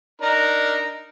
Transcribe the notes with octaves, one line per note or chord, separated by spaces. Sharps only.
D4 D#4 A#4